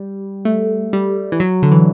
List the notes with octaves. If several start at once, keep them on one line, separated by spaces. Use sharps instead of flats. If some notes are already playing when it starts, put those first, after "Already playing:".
Already playing: G3
A3
G3
E3
F#3
D3
E3